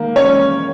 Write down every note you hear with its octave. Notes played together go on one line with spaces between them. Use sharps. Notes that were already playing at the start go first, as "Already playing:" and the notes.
Already playing: D#3 A#3
C#4 C#5